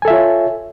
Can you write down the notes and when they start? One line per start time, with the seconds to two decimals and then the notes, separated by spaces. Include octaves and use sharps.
0.02 G#5
0.05 A4
0.08 E5
0.10 F4
0.13 C#5